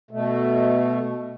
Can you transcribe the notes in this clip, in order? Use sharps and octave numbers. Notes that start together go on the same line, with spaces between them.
B2 A3